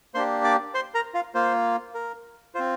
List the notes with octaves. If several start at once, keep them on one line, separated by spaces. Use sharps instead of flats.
A#3 D4 G4 C5 C6
D5 D6
C5 C6
A#4 A#5
F4 F5
A#3 F4 C5
A#4
C4 F4 C5